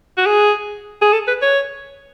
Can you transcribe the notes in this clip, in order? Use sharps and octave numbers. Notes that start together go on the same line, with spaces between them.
F#4
G#4
G#4
A4
B4
C#5